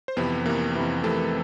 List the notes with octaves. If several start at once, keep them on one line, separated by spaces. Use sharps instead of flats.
C5
F2 C3 E3 B3 B4
F2 C3 E3 A#3 A#4
F2 C3 E3
F2 C3 E3 A3 A4